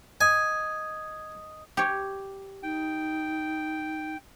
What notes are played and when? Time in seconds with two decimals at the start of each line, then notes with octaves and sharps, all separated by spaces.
0.21 D#5 G#5 D#6
1.77 G4 C#5
2.63 D#4 G5